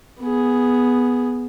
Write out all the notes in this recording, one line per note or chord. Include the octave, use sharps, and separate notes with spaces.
B3 G#4